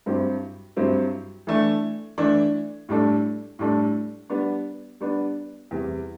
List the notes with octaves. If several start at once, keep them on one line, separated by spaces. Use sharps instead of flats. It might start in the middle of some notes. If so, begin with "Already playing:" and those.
G2 F#3 C4 E4 G4
G2 F#3 C4 E4 G4
E3 A3 D4
E3 A3 D4
A2 G3 D4 A4
A2 G3 D4 A4
G3 B3 D4
G3 B3 D4
E2 C3 G3